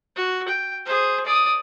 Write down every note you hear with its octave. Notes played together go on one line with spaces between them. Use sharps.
F#4
G5
G#4 C5
D5 D#6